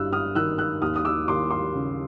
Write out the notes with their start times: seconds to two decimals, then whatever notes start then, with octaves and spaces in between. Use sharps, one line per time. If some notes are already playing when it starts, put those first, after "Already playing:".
Already playing: G1 G2 E6 F#6
0.13 D#6 F6
0.35 D#3 E6 F#6
0.58 E6 F#6
0.82 D#2 D#6 F6
0.96 D#6
1.05 D6 E6
1.28 D#2 C6 D6
1.51 C6 D6
1.74 C#3